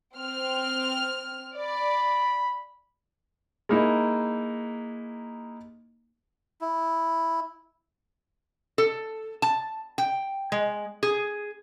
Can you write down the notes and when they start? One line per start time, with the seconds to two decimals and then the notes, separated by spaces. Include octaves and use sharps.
0.16 C4 F6
1.57 D5 B5
3.69 G#3 A#3 D#4 E4
6.61 E4
8.78 A4
9.42 A5
9.98 G5
10.52 G#3
11.03 G#4